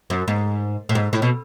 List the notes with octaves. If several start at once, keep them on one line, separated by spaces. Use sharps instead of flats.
F#2
G#2
A2
G#2
A2
B2